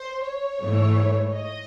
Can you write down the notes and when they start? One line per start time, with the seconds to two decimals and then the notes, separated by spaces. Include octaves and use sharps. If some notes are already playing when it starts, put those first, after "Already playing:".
Already playing: C5
0.24 C#5
0.61 G#2 E3 A3
1.34 D#5